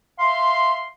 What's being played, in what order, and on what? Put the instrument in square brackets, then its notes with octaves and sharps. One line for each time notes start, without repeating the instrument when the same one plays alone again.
[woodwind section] E5 F5 C6